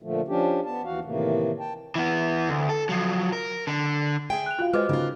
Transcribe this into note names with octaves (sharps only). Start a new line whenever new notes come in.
A#2 D3 F3 A3
F3 C#4 D4 G4
B3 A5
D#2 E3 F#4 F5
A2 C3 D#3 E3 A3 A#3
G5 A5
E3 B3
D2
A4
F3 F#3
A#4
D3
G#4 E5 G5 G#5
F#6 F7
F4 F#4 F5 F#6
G#3 F#4 B4 C5 D#5 D6
C#3 A#3 D#4 F4